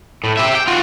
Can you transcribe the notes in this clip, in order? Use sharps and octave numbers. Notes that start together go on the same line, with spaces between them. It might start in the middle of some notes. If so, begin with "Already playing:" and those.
A2
G4 E5
G5
F4 F#4